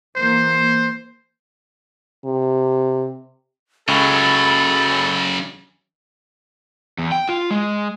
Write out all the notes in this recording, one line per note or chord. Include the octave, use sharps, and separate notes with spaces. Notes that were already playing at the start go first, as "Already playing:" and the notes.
E3 A#3 C5
C3
C#2 C#3 F#3 A4 B5
E2
G5
F4
G#3